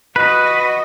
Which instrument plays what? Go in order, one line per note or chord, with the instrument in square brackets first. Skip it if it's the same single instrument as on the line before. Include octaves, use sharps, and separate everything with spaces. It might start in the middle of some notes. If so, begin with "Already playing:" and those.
[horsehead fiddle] F#4 D#5 [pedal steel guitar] B4